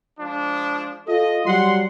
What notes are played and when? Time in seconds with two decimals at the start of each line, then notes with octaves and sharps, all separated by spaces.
0.20 F3 G#3 D4
1.08 F4 A4 D#5
1.46 F#3 G3 F#5 C6